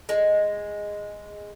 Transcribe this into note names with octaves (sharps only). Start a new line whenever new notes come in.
G#3